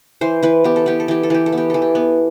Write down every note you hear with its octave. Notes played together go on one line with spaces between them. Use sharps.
E3 C5
E3 B4
B3 G4
A4
B3 G4
A4
E3 G4
A4
E3 G4
A4
B3
G4
E3 A4
G4
B3